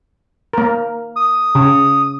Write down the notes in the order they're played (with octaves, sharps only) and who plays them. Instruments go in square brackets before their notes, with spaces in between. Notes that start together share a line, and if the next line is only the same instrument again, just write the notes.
[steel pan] A#3 A#4
[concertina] D#6
[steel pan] C#3